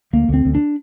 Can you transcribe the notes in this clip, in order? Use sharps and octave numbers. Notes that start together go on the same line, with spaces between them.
D2 A#3
D2 C4
D2
D4